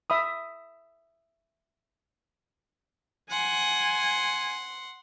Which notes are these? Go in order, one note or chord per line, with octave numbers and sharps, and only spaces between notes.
E5 B5 D#6
F#5 G#5 C6